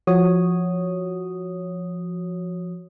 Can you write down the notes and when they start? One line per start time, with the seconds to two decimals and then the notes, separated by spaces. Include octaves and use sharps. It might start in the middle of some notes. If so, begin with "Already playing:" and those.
0.07 F3 F#4 C#5 D#6